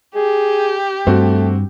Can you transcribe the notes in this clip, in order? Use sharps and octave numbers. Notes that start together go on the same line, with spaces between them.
G4 G#4
G2 A3 C4 F#4